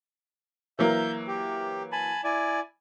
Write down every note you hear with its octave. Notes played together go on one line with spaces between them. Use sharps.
E3 F#3 A#3 E5 G6
G4
G#5 A5 B5
E4 D5 G#5